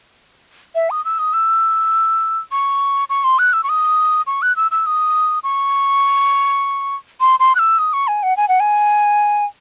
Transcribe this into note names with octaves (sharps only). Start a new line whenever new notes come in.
E5
D#6
E6
D#6
E6
C#6
C#6
C6
F#6
E6
C#6
D#6
C#6
F#6
E6
E6
D#6
C#6
C6
C6
F#6
E6
D#6
C#6
G#5
F#5
G#5
F#5
G#5